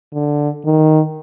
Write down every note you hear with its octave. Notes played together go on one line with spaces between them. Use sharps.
D3
D#3